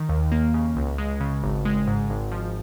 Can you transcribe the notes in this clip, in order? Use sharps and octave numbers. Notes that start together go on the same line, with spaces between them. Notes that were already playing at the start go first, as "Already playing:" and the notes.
Already playing: D#3
D#2
A#3
C#3
C#2
G#3
C#3
G#1
G#3
G#2
G#1
F3